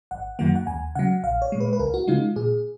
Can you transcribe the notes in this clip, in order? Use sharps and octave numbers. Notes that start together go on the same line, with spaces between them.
G#1 F#5
F#2 D#3 F#3 A#3 F#5
F#5
D#2 G#5
C#3 F#3 F#5
A#1 F5
C#5
A#2 G#3
B4
B4
C#2 A#4
F#4
C#3 G#3 D#4 F4
A#2 G#4